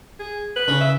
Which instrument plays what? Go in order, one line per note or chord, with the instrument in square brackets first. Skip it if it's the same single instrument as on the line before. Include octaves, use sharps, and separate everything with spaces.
[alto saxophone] G#4
B4
[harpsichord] C#3
[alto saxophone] E5